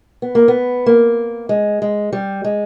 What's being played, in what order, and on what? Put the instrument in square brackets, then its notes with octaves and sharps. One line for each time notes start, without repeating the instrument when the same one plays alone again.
[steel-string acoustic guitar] B3
A#3
B3
A#3
G#3
G#3
G3
G#3